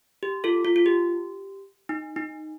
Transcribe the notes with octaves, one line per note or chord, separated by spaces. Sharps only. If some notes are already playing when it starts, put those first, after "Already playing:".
G4
F4 A4
F4
F4
G4
D#4
D#4